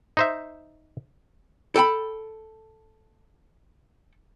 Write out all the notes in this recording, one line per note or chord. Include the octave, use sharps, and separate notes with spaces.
D#4 C5 E5
A4 G5 A5 B5